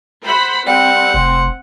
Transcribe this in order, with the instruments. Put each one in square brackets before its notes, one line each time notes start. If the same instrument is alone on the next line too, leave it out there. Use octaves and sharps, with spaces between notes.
[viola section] C5 F#5 B5
[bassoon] G3 [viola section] C4 [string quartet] F#5
[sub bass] F1 [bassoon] C5